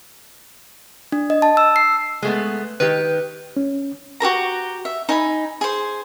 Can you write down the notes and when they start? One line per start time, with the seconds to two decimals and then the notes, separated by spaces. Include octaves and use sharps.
1.12 D4
1.30 D#5
1.42 A5
1.57 E6
1.76 C7
2.22 G#3 A3 B3
2.80 D#3 G4 B4
3.57 C#4
4.20 F#4 G4 A#4 A#5
4.85 E5
5.09 D#4 G#5 B5
5.61 G#4 C5